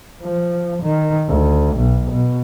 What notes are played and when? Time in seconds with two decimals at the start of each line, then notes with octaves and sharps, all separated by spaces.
0.22 F3
0.82 D#3
1.28 D2
1.77 B1
2.11 B2